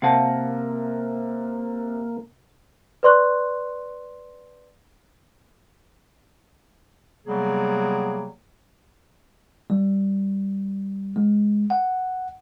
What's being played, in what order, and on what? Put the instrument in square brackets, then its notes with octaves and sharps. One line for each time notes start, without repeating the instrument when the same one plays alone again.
[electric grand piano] C3 A#4 A#6 [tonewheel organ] A#3 [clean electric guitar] F5 F#5 A5
[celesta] B4 D5 C6 C#6 F#6
[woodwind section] C3 F#3 G3 A#3 B3 G#4
[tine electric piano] G3
G#3
F#5